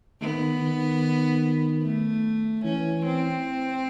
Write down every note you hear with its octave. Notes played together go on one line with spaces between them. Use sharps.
D#3 B3
D#3
A3
E3 C#4
C4